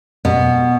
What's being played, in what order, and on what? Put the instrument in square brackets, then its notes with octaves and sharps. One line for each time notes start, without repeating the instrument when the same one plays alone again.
[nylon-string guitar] B2